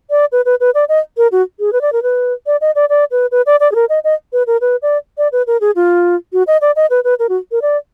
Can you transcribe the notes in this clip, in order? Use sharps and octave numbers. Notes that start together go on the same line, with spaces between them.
D5
B4
B4
B4
D5
D#5
A#4
F#4
G#4
B4
D5
A#4
B4
D5
D#5
D5
D5
B4
B4
D5
D5
G#4
A#4
D#5
D#5
B4
A#4
B4
D5
D5
B4
A#4
G#4
F4
F#4
D#5
D5
D#5
B4
B4
A#4
F#4
A#4
D5